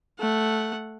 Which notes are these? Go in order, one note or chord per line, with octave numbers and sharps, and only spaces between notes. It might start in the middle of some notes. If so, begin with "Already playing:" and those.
A3 F#5